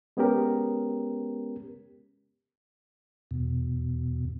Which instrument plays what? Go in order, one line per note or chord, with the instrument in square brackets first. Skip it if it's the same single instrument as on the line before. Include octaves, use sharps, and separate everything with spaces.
[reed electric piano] G#3 B3 C#4 G4 A#4
[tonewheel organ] E2 B2